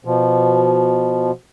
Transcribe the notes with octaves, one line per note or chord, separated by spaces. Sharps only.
B2 F3